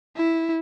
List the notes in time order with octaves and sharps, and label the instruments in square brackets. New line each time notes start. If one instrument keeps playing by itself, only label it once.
[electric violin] E4